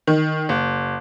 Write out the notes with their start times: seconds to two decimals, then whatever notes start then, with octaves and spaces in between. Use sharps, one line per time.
0.07 D#3
0.49 F#1